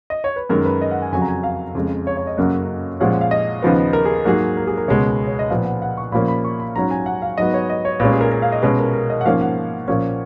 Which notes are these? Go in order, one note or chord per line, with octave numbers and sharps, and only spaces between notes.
D#5
C#5
B4
F#2 D#3 G#3 A#4
B4
D#5
F#5
G#5
F2 C#3 F#3 G#5
A#5
G#5
F5
F2 C#3 G#3
C#5
C#5
D#5
F#2 C#3 F#3 A#3 C#4
A#2 F3 G#3 C#4 F#5
F#5
F5
D#5
D#2 C#3 F3 B3
A#4
G#4
G#2 F#3 A#3 G#4
A#4
G#4
A#4
C#2 B2 G#3 B3 C#5
C#5
D#5
A#2 F3 B3 F5
F#5
F#5
C#6
A#2 F3 A#3 C#4 B5
B5
C#6
B5
G#2 F#3 C#4 A#5
G#5
F#5
F5
G#2 F#3 B3 D#5
C#5
D#5
C#5
A#2 G#3 C#4 B4
G#4
A#4
A#4
F5
D#5
B2 G#3 C#4 B4
A#4
A#4
D#5
F#5
G#2 F3 A#3 C#4 F5
F#5
A#2 F3 A#3 C#4